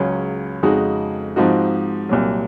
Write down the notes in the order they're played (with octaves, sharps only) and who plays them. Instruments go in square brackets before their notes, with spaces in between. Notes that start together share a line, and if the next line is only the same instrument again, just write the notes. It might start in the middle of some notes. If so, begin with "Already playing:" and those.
Already playing: [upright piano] C#2 C#3 F#3 C#4
F2 C#3 G#3 D#4 F#4
G#2 F3 C4 D#4 F#4
C2 A#2 F#3